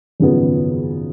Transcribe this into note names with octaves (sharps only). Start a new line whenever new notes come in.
G#1 F#2 C#3 F3 B3